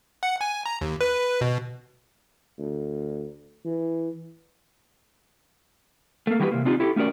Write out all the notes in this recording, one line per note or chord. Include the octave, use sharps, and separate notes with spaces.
F#5
G#5
A#5
D#2
B4
B2
D2
E3
A3 A#3
E3 G3 F#4 G4 A#4 B4
C3 A#3
C4 D4 D#4 F4 G4
E4 G4 A4
A3 C#4 F#4 A#4 D5